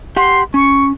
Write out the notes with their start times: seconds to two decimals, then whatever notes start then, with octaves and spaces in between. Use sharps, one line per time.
0.17 G4 F#5 C6
0.54 C#4 C#6